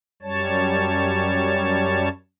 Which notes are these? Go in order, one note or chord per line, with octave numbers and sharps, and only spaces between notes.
F#2 G3 C#5 A5